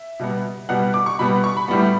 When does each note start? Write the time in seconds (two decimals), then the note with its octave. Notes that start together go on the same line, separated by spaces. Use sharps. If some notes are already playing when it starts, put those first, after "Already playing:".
Already playing: E5
0.19 B2 G3 B3
0.69 B2 G3 B3 F#5
0.94 D6
1.06 C#6
1.19 B2 G3 B3 B5
1.44 C#6
1.57 B5
1.68 A2 G3 B3